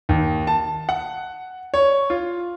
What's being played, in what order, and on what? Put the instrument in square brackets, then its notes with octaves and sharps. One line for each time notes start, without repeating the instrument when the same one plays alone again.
[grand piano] D#2
A5
F#5
C#5
F4